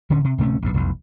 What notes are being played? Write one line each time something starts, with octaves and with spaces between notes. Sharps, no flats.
D1 D3 C#4
C3
D1 C3 A3 C#4
A#1 E2 G2
F1 B1 E2